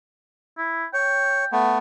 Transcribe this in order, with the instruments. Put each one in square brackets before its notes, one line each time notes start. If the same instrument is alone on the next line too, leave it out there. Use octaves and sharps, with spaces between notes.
[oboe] E4
[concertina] C#5 [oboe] G5
[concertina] A3 B3